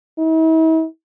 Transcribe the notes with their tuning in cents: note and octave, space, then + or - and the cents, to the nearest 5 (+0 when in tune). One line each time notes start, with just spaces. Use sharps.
E4 -45